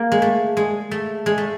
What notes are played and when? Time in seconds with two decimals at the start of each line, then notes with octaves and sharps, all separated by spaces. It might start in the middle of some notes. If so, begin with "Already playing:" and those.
Already playing: A#3
0.12 G#3
0.22 A3
0.57 G#3
0.91 A3
1.26 G#3
1.38 A3